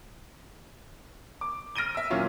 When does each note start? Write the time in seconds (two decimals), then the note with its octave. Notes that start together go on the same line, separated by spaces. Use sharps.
1.41 D6
1.76 F6 A#6 D7 D#7 G7
1.95 E5 E6
2.10 A#2 E3 F#3 C#4 F4